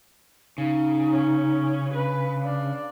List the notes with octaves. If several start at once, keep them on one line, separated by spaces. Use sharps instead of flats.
C#3 D#4
C#4
D4 B4
D4 F5